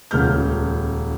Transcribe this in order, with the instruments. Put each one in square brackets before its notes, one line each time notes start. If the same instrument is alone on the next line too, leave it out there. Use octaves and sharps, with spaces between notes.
[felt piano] D#1 C#2 G#3 F6 G6